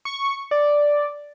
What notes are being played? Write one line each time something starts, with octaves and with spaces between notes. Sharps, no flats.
C#6
D5